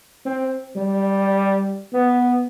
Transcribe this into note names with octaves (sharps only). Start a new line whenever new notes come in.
C4
G3
B3